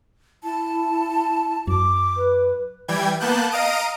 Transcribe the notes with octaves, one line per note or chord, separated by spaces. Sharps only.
E4 A5
F#2 D6
B4
E3 G3 G5 G#6
A#3 B3 A5 F#6 G6
D#5 F5 A#5 D#6 D7 D#7